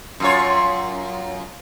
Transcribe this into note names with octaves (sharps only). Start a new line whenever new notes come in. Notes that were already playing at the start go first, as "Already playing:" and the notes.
F#2 F4 C#5